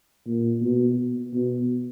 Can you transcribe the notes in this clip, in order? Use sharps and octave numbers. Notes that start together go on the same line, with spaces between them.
A#2
B2
B2